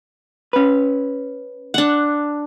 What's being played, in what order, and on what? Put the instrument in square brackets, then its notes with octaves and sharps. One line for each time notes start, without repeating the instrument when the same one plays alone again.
[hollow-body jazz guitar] C#4 B4
[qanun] D4 F#5